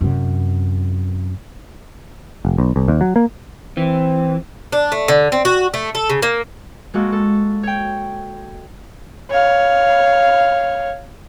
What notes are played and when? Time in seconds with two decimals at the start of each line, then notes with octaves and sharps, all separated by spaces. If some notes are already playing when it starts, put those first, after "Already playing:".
0.01 F#2 C3
2.45 F1
2.58 B1
2.76 C2
2.88 D#2
3.01 F#3
3.16 A#3
3.77 E3 C4
4.72 D4
4.92 A3
5.08 D3
5.32 C4
5.45 F#4
5.74 A3
5.95 A4
6.10 C#3
6.22 A#3
6.94 G#3 A#3 F#4 A4
7.12 A4
7.63 C#5 G5
9.30 C#5 F5